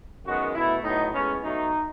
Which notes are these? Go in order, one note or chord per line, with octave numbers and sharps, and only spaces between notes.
F#2 D#3 G#3 B3 F#4
B2 A3 E4
A2 F#3 B3 D#4
A2 G#3 B3 C#4
B2 F#3 A3 D#4